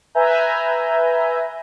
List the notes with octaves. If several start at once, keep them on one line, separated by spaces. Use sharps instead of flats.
B4 E5 G#5 A#5 G6